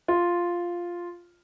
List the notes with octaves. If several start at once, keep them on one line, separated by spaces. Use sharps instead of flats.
F4